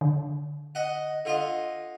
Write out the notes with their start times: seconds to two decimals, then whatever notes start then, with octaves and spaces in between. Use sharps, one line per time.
0.01 D3
0.75 D#5 F#5
1.25 D3 F4 D#5